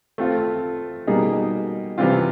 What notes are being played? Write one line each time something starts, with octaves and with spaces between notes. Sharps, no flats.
A3 C4 F4
B2 G3 A#3 D#4 G#4
C3 E3 G3 C4 F4